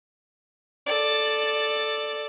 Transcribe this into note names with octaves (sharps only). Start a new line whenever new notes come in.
A4 D5